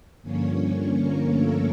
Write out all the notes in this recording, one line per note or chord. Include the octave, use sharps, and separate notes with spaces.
G2 D3 F3 A#3 C#4 C#5
C#4 C#5
A#3 A#4
A3 A4